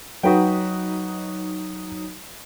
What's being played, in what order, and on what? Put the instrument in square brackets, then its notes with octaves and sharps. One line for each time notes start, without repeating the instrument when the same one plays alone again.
[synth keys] F#3 D#4 D#6 [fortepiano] F#4 B4 G5